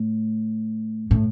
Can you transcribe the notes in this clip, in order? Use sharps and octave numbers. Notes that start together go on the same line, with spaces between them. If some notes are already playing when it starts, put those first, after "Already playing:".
Already playing: A2
A2